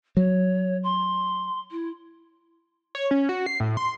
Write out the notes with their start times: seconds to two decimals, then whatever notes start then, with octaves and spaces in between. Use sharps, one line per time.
0.17 F#3 C#5
0.83 C6
1.71 E4
2.95 C#5
3.11 C#4
3.29 F#4
3.46 C7
3.60 A2
3.77 C6